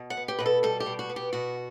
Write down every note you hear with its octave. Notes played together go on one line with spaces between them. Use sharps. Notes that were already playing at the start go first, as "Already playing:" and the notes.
Already playing: B2
F#5
B3
G4
B2 B4
A4
G3 A4
G4
B2
F#4
B3
G4
B2 F#4